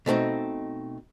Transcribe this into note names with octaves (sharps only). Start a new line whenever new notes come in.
B2 A3 C4 D#4